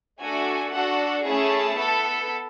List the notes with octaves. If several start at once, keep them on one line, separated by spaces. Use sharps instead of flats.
A3 D4 F#4 A4 G#5
D4 F#4 A4 F#5
A3 C#4 E4 G#4 A5
B3 E4 A4